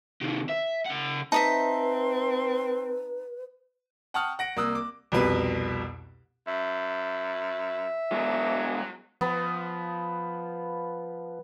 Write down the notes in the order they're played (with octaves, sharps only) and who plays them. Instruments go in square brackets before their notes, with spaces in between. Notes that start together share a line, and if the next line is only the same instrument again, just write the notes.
[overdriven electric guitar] C3 D#3
E5
C#3 F#5
[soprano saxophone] C4 [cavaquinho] D#4 D#5 E5 [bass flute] B4 [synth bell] A5
[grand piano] F#5 G5 A5 C#6 D#6 F6
F#5 A#6 D7
C2 A#3 D#6 E6 F#6
D6
C2 F2 B2 B4
[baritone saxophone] F#2 [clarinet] E5
[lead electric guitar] B2 G#3 [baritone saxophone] F#3
[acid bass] F3 [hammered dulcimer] B3 B4